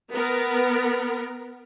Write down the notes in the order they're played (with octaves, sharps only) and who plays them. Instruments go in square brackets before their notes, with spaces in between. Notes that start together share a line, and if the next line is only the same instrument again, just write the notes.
[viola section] B3 A#4